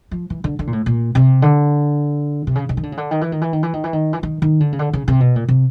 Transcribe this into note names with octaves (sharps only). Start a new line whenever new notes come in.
F3
E3
D3
D3
A#2
A2
A#2
C3
D3
C3
C#3
C#3
D#3
D3
C#3
D3
D#3
E3
D#3
E3
D#3
E3
D#3
E3
D#3
E3
D#3
D#3
D3
C#3
D3
C#3
C3
B2
A#2
C3